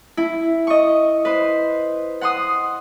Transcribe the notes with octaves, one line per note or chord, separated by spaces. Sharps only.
E4
D#5 C#6
B4 C5
F#5 C6 D#6